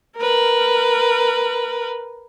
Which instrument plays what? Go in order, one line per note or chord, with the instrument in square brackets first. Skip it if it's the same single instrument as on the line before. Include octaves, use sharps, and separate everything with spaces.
[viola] A#4 B4